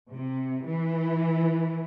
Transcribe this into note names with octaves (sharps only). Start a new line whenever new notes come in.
C3
E3